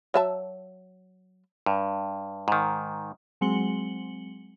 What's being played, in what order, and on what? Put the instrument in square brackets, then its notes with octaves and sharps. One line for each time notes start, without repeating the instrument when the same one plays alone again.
[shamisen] F#3 E5 A5
[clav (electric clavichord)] G2
G#2 D#3
[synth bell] F#3 G#3 C4 C#7 F#7 G7